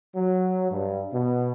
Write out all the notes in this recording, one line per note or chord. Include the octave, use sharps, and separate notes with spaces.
F#3
G2
B2